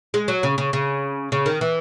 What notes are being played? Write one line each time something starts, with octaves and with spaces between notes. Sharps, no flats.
G#3
F#3
C#3
C#3
C#3
C#3
D#3
E3